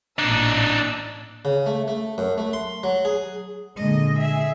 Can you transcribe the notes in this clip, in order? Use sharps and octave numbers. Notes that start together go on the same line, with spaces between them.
A1 A#2 D4 D#4 E6
C#3
A3
A3
F#2
A3
C6
F#3
G#4
A#2 D3 G#3 A#3 D#5
G#4 E5